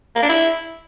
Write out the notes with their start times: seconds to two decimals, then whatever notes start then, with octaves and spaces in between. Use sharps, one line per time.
0.16 A#3
0.22 D4
0.29 E4